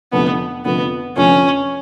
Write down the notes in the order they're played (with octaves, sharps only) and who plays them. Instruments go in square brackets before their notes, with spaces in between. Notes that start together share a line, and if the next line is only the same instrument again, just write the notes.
[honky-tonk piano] F1 F2 D3 F3 A3 [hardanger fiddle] B3
[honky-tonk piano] F1 F2 D3 F3 A3 [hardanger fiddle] B3
[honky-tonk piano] F1 F2 D3 F3 A3 [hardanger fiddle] C#4